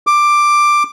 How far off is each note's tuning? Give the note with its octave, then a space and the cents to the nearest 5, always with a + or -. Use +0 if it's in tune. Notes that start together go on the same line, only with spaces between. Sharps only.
D6 +10